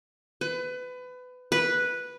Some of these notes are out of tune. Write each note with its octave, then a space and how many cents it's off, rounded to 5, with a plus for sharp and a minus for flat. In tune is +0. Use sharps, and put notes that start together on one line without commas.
B4 +25
B4 -5